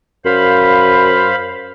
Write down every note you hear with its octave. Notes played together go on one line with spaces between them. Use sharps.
F#2 C5 F5 B5